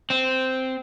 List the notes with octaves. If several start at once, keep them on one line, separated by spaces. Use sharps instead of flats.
C4